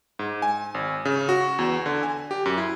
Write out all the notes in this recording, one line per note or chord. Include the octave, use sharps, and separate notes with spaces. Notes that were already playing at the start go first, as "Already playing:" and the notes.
G#2
G#5
G#1
C#3
F#4
E2
D3
G#5
G4
F#2
E4